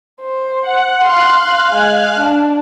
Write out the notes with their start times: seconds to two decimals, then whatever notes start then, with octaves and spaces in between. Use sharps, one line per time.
0.21 C5
0.61 F#5
1.02 F5 C6 F#6
1.73 G#3 G#5
2.19 D4 A5